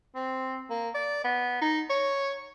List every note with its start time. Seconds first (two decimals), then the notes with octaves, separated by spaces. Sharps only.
0.15 C4
0.70 A#3
0.95 D5
1.24 B3
1.62 D#4
1.89 C#5